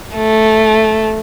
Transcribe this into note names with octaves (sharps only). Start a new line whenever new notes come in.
A3